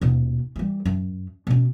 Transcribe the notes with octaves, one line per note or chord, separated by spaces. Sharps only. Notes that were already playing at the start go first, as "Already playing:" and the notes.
D#1 B2
E3 G3
F#2
B2 C#4